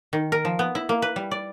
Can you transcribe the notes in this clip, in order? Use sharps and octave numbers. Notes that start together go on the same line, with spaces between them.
D#3
A#4
F3
B3
E4
A#3
B4
G3
D5